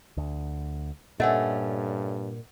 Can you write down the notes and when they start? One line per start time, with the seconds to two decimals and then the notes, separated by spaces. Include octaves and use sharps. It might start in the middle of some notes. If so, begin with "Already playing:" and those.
0.17 D2
1.20 G2 A#2 A3 C#4 D#5 F#5